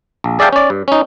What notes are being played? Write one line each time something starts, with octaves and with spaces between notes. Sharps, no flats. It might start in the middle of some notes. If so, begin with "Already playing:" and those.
A#1
G#4 D5 E5 F5 G5 A5
C#4 D5
G2
C#4 D#4